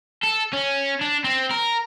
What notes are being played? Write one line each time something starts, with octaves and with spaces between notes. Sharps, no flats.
A4
C#4
D4
C4
A#4